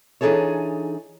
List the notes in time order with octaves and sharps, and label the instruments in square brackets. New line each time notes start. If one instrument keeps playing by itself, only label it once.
[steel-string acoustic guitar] E3 D4 D#4 G#4 A4 C#5